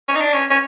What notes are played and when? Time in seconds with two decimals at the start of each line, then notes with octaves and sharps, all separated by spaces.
0.08 C#4
0.15 D#4
0.21 D4
0.33 C#4
0.50 C#4